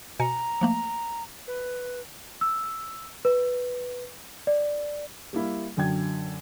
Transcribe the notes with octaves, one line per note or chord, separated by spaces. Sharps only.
B2 G#5 A#5 C#7
F3 A3 A#3
B4
E6
B4
D5
G3 A#3 E4
F#2 D3 F#3 G5 G#6